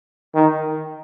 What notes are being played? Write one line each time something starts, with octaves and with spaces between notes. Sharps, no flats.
D#3